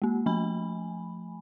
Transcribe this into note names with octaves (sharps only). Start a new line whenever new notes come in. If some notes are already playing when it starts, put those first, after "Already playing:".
G#3 A#3
F3 A3 G#5 B5